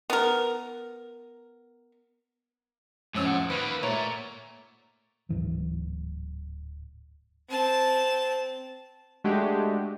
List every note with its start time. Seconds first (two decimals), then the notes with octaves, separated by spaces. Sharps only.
0.10 B3 A#4
3.15 F2 A2 C#4 E6
3.26 F2 A#2 F#5
3.50 D#3 A#3 B4
3.83 A#2 A3 C#5 A#5
5.29 D1 G#2 E3 F#3
7.49 C4 A5
9.24 G#3 A3 D4 F#4 G4